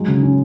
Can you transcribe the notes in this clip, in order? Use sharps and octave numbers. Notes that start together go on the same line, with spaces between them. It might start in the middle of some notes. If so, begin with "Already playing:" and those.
Already playing: F#3 G#3
C#3
C#4